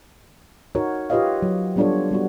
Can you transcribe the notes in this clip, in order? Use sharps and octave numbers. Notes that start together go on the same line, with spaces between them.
D#4 F#4 A#4 C#5
F4 G4 B4 C#5 D#5 F5
F#3
G3 B3 D4 F4 A4 C#5
G3 B3 F#4